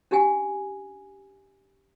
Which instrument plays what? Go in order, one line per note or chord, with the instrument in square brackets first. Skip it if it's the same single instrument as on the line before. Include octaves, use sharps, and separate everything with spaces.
[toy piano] C#4 D4 G4 F#5 G#5